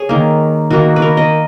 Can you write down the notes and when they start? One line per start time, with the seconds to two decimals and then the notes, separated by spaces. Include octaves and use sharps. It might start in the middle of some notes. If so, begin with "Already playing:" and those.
Already playing: G#4 C#5
0.09 D#3 A#3
0.70 D#3 A#3 F#4
0.96 B4
1.02 A#4
1.17 D#5